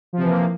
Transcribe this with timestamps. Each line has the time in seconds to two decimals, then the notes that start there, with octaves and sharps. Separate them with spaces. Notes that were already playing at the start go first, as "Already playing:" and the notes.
0.13 F3
0.18 C3
0.22 E3
0.27 A#3